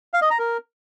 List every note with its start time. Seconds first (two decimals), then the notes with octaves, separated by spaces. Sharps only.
0.14 F5
0.22 D#5
0.30 A#5
0.39 A#4